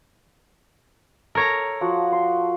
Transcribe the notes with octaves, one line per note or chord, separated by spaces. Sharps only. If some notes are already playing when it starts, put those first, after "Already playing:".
A4 A#4 C#5 A#5
F3 F#4
C6